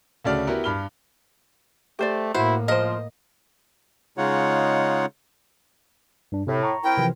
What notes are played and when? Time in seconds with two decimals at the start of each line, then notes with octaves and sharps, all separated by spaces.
0.25 D2 C#3 A3 F#4 D5 F6
0.47 B3 E4 F#4 G4 A#4
0.64 G2 B5 F6 G7
1.99 A3 G4 C5 D5
2.35 A2 A#3 E4 F#4 C5
2.68 F3 A#4 C5 D#5
4.18 C#3 G#3 D#4 F4 C#5 F#5
6.32 G2 D4
6.47 A2 C3
6.63 A#5 C#6
6.84 C4 E4 A#4 G5
6.97 C3 E3 F3